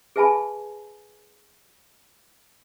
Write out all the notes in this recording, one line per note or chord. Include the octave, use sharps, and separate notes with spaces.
G#4 B4 E5 G#5 A5 B5